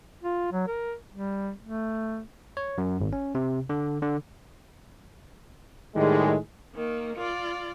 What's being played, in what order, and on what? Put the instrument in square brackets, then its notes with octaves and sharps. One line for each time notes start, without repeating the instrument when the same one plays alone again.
[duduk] F4
F#3
A#4
G3
A3
[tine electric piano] C#5
F#2
G#1
C#4
C3
D3
D3
[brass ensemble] A2 D#3 G3 G#3
[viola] D#3 A#3
F4 D5